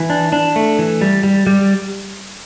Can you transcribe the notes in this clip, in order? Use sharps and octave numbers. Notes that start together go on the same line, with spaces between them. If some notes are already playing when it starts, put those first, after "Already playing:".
Already playing: E3
D4
D4
A3
E3
G3
G3
G3